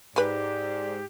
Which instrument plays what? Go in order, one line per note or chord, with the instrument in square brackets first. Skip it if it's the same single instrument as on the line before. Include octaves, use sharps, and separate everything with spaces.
[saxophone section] G#2 [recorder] G4 [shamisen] B4 G#5 [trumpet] D5